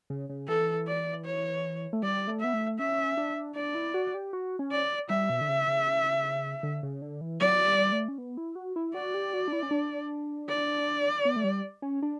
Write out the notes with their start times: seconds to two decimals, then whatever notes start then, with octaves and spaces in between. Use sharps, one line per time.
0.10 C#3
0.29 C#3
0.48 E3 A4
0.87 D5
1.25 C#5
1.93 A3
2.03 G3 D5
2.27 A3
2.41 B3 E5
2.54 A3
2.79 C#4 E5
3.17 D4
3.56 D4 D5
3.75 E4
3.94 F#4
4.14 G4
4.33 F#4
4.59 C#4
4.72 D5
5.10 G3 E5
5.30 B2
5.41 D3
5.49 C#3
5.68 C#3
6.63 D3
6.83 C#3
7.02 D3
7.21 E3
7.40 F#3 D5
7.66 G3
7.92 A3
8.08 C#4
8.18 B3
8.37 E4
8.55 F#4
8.76 E4
8.94 F#4 D5
9.14 G4
9.33 F#4
9.48 D4
9.53 E4
9.63 C#4
9.71 D4
10.49 D5
11.25 B3
11.36 A3
11.44 G3
11.82 C#4
12.03 D4